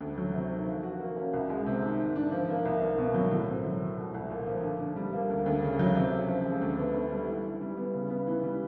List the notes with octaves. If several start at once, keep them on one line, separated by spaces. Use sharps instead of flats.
D2
F#3
C3
D#3
F3
F#4
A#3
C#4
C2
G#3
C3
D#3
G#2
D4
F3
A#3
C2
A#3
B2
F#3
A2
C4
F#3
A3
C2
C2
A#2
F3
D3
D4
G3
A#3
D2
D2
C#3
F#3
C3
C#4
F3
G#3
D2
B3
D3
G3
E3
E3
G3
B3
C#3
B3
E3
G3